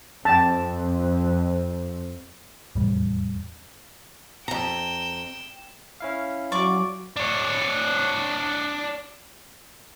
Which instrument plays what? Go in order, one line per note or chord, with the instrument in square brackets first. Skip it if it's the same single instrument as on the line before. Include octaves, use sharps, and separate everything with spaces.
[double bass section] F2 [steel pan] G5 A5
[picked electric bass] F1 E2 A2 G3
[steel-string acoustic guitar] F2 A#5 [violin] G5 E7
[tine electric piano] C#4 E4 F5
[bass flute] F#3 [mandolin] D5 C#6 D6
[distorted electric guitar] D4 C#5